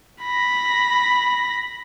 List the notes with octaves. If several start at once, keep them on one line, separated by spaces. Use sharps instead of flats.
B5 A#6